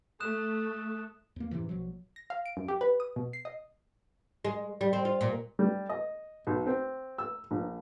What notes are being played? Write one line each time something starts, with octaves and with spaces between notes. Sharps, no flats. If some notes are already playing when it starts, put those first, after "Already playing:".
A3 D#6 F#6 E7
E2 A#3
F#2 A2 C3 E3
A#1 B2 F3 F#3
A#6
F5
D7
F#2
G4
B4
D#6
B2
C7
D#5
G#3
G3
C4
F4
A#2
G3
D#5
B1
C4
E6
A#1